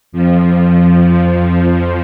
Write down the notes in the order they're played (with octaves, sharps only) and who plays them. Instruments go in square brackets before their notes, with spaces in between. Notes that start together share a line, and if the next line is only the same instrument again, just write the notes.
[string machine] F2 F3